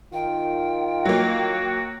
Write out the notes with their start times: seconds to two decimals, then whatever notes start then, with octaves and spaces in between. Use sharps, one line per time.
0.14 D#3 F4 G5
1.05 F#3 A#3 F#4